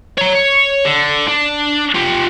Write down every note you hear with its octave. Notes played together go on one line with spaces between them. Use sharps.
C#5 A#5
C#5
D3
D4
F4 G4